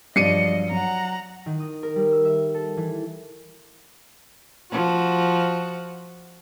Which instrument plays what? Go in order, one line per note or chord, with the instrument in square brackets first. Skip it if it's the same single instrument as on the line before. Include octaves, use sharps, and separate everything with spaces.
[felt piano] G2 F3 F#3 [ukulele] D5 [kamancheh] D#5 [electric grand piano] C7 C#7 D#7
[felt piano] F#3 [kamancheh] F#5 A#5
[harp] D#3
D#6
A#4
G3
E6
E5
A4
E3
[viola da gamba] F3 F#4